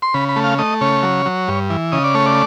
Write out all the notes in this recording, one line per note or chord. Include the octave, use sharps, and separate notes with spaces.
C6
C#3 B5
B5
A3
F5
A3 D#5
C#3 C#5
F#3
F#3
G2
E3
C#3 D#5
D5
A3 C#5
D5